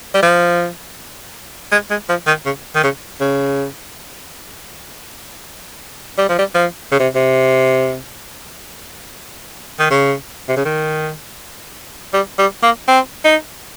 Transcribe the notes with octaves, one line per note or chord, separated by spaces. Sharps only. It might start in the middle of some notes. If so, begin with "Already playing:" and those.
G3
F3
G#3
G#3
F3
D#3
C#3
D#3
C#3
C#3
G3
F3
G3
F3
C#3
C3
C3
D#3
C#3
C3
C#3
D#3
G3
G3
A#3
C4
D#4